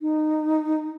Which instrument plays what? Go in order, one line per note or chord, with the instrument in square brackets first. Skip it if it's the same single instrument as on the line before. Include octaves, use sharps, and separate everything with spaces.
[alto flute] D#4